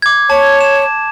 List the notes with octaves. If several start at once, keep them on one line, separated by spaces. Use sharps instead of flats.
D6 G#6
C#5 A5
E7